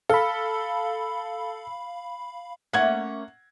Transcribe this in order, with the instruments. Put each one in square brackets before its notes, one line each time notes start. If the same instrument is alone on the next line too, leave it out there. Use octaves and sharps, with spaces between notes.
[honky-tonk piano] A4 [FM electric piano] F5 B5
[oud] A3 A#3 C#4 [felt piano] F#5 G#6